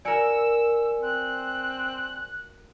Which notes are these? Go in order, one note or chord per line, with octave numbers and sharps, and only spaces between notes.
F#4 A#4 D5 G#5 E6 C#7
C4 F#6